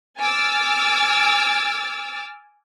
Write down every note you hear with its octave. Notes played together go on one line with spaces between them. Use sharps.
G#5 D6 E6 F6 A6